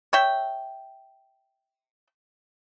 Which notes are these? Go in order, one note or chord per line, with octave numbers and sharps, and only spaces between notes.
C#5 E5 G5